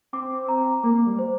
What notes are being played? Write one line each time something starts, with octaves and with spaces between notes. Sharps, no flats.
C4 D6
A#5
A#3 D6
G3
C5